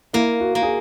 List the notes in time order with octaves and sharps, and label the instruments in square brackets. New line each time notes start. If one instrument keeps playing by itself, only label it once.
[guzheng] A#3 [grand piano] E4
[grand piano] F#4
[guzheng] A#3
[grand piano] G#4